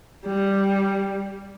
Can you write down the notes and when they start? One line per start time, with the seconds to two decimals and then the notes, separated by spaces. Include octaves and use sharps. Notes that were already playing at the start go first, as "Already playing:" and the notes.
0.25 G3